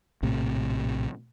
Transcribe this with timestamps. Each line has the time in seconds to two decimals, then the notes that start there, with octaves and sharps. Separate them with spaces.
0.22 A#1 A2 C3